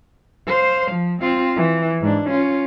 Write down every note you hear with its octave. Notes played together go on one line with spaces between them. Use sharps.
C5 F5
F3
C4 F4
E3
G#2 D4
C#4 F4